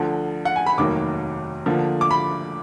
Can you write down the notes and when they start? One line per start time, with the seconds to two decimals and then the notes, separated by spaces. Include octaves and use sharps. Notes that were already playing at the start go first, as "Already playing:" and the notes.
Already playing: D2 D3 F3
0.45 F#5
0.56 G#5
0.66 B5
0.78 F1 D#2 D#3 F#3 A#3 D6
1.66 D2 D3 F3 A#3
2.01 D6
2.11 B5